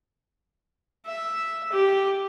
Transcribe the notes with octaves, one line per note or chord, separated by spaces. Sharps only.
E5
G4